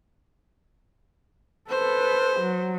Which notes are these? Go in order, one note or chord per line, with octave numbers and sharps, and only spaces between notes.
A4 B4 C5
F#3